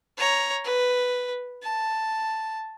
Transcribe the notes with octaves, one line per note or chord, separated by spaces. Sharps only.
C#5 A#5
B4
A5